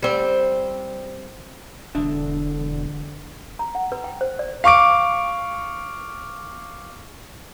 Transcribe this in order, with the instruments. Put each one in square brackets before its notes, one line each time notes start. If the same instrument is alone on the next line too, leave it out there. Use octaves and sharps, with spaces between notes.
[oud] G3 C4
[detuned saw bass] E1 [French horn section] D3 [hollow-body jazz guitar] D4 E5
[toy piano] A#5
F#5
B4
G5
C5
D5
[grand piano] F5 C#6 D6 D7